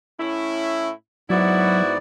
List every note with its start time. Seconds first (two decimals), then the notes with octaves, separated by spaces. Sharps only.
0.20 A2 C#4 E4
1.30 G#2 F#3 B3 E4 F#4 D5